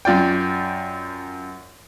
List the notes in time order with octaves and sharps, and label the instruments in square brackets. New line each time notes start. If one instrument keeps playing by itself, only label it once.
[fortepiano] F#2 F4 D5 G5